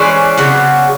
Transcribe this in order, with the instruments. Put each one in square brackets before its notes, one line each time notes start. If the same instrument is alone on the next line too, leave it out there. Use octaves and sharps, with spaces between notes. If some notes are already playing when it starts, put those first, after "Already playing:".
Already playing: [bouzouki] E3 G#3 C#4 C5 D5
C#3 F#3 B3